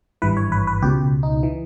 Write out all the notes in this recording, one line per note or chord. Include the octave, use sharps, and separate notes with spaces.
G#1 G2 E3 B4
C#5
B4
B4
C#2 B2 G4
D#4
E3